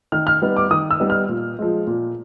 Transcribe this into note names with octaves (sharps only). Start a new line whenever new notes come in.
D#3 F6
F6
G3 B3 D#4
D6
D#3 D#6
E6
G3 B3 D#4
F6
A#2
F3 G#3
A#2